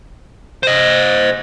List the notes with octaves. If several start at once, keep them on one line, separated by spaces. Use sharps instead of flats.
C5 D#5